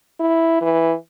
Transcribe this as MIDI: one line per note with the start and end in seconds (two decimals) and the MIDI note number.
0.20 0.61 64
0.62 0.94 52